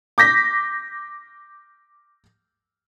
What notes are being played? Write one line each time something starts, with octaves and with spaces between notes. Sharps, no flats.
D6 G6 A#6 B6